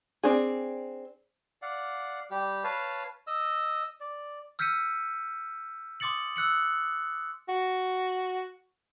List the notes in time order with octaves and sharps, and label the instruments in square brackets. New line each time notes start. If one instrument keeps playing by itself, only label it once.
[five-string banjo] C4 D4 G#4
[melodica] D5 F5 F#5
G3 G4
B4 C#5 F5 A5
D#5 E6
D5
[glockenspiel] E6 F6 G6 B6 C#7 D#7
C6 D6 D#6 A6 C#7 F#7
E6 F#6 C#7 F#7
[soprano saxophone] F#4